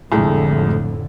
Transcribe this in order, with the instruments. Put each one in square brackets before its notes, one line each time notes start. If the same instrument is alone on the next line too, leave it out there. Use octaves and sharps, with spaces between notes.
[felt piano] C2 G#3 A3 [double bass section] F2 A2 D3